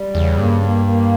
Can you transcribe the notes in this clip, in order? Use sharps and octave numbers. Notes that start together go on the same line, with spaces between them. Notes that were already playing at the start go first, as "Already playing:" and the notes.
Already playing: G3
E2 C#3
G2 A#3
A#3
A#3